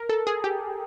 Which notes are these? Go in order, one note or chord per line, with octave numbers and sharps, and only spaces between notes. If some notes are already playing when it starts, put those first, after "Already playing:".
Already playing: A#4
A4
G#4
G4